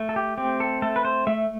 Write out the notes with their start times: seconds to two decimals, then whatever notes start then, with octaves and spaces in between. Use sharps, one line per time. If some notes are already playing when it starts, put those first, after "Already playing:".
Already playing: A3
0.09 A4
0.16 G4
0.38 C4 G4
0.60 A4
0.82 A3 A4
0.96 B4
1.05 C5
1.27 A3 E5